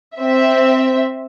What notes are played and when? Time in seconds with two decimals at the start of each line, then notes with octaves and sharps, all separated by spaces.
0.18 C4 E5